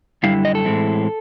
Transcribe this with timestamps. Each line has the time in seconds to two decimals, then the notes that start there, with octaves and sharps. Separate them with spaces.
0.23 F#2 D3 G3 E4 F5
0.45 D#5
0.55 A4
0.65 A2 E3 G#3 C4 E4